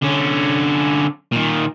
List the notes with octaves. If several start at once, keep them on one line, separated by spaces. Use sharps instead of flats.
D3 C#4
A#2 D#3